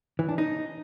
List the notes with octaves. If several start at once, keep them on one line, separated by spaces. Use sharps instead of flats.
E3
D4
D#4